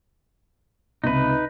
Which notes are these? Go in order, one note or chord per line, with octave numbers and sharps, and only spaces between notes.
C#2 C3 D#4 B4